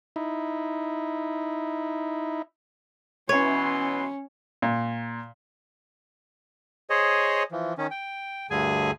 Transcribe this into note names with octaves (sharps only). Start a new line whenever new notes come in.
D#4 E4
B2 E3 C#4 C#5 C6
A#2
G#4 C5 C#5 D#5
E3 F3
D#3 C#4
G5
D2 G2 D3 G#4 G#5